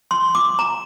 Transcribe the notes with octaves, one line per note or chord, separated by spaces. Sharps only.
C6
D6
A#5